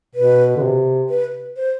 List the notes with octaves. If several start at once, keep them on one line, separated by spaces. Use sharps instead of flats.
B2 B4
D3
C3
B4
C5